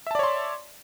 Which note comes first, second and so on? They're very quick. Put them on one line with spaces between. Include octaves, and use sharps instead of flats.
E5 A5 D5 C#5 C6